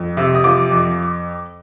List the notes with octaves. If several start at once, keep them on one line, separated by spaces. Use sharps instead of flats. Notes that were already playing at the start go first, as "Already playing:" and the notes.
Already playing: F2
C3
D#6
F3 D6
F2